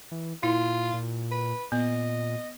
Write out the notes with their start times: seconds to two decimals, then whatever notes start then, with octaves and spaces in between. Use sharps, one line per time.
0.11 E3
0.43 A#2 E4 F4
0.93 A#2
1.31 B4
1.72 A#2 B3 D#5